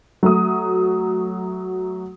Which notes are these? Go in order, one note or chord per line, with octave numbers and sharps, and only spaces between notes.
F#3 A3 D#6